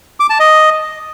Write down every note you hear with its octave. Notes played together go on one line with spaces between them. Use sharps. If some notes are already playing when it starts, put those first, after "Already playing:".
D6
A5
D#5